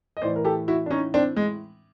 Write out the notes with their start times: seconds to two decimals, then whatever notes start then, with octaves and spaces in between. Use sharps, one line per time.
0.17 D#5
0.22 A2 E3 C5 D5
0.36 A#4
0.45 G4 A4
0.68 E4 F#4
0.86 D4
0.91 C#4 D#4
1.14 C4 D4
1.36 G#3